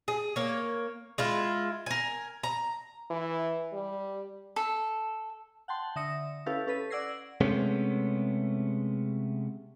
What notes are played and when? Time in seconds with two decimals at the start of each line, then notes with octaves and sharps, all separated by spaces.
0.08 G#4
0.36 A#3 C#5
1.18 G#3 E4 F4
1.86 A#4 G#5
2.43 A#5
3.10 E3
3.73 G3
4.56 A4
5.68 F#5 G5 A5 C6
5.96 D3 E5 D#6 A#6 C#7
6.46 C#4 E4 G4 A4 B4 F5
6.67 C#4 A4 B4 B6 D#7
6.90 D5 F#5 E6 G#6 A#6 C7
7.41 C3 G#3 A3 B3 C#4